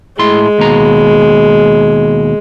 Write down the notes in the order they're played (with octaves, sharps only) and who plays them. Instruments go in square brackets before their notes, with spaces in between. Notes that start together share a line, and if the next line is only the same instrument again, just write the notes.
[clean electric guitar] A2 E4 C6 [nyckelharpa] G#3
[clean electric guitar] D#2 B2 A#5